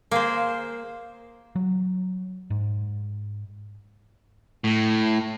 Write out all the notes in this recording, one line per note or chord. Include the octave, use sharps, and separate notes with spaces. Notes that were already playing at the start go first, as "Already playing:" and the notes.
A#3 G#4 C5
F#3
G#2
A2